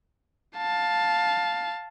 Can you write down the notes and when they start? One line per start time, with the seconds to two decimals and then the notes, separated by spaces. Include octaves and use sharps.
0.57 F5 A5